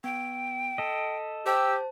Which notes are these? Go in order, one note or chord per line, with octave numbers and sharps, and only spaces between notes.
B3 G5
A4 D#5 B6
G4 C5 A5 E6